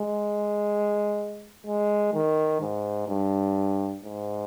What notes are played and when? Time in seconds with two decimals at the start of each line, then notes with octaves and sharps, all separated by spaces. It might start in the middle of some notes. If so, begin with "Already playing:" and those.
Already playing: G#3
1.66 G#3
2.14 D#3
2.61 G#2
3.09 G2
4.04 G#2